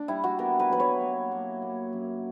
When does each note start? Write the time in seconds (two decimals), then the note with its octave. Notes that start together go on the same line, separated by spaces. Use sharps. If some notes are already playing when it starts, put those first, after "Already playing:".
Already playing: D4
0.08 G3 E4
0.24 F#4
0.39 B3 A#4
0.60 B4
0.70 F#3 B4
0.80 C#5
1.01 A#3
1.32 A#3
1.62 A#3
1.93 F#2